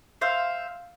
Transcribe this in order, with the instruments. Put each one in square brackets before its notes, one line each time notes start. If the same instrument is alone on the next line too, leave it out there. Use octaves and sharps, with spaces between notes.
[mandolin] C5 E5 F5